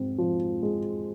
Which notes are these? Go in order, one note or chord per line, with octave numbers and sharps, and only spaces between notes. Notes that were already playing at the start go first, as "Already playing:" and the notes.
Already playing: G#2 C4
F3
G#3